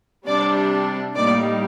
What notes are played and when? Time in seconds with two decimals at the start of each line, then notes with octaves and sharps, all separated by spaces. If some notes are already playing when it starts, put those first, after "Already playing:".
0.27 C3 G3 D4 D5
1.15 A2 G3 A#3 D#4 D5